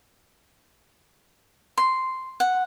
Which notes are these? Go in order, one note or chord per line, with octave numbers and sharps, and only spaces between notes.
C6
F#5